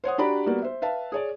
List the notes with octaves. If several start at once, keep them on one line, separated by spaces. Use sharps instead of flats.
C5 C#5 F#5 D#6
D4 F#4 G4 D5 A#5 B5
G3 A#3 B3 F#4 D5
C5 E5
B4 E5 F5 A5
G#4 C#5 D5